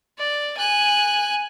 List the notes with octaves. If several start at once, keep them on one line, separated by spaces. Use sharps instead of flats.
D5
G#5 F#6